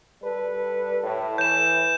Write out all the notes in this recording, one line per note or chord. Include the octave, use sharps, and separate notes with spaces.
G3 A4 B4
A2
E3 G6 E7